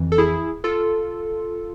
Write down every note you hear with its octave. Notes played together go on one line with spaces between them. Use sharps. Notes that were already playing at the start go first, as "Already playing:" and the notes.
Already playing: F2 E3
A4
E4 G#4
F4 A4